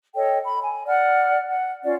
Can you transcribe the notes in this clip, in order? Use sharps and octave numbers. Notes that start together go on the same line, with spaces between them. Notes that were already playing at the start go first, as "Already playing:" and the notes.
A4 C#5 D#5 G5
B5
G#5
D5 F#5 F6
F#5
C#4 F4 D5